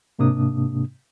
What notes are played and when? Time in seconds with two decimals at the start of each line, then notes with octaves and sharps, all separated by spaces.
0.19 G#2 C3 A#3 D4 D#6